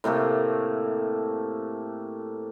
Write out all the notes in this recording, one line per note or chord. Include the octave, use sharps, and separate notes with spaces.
A2 C3 A3 A#3